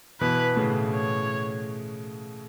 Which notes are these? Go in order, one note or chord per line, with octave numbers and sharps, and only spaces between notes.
B2 E3 B4
A2 C#3
C#5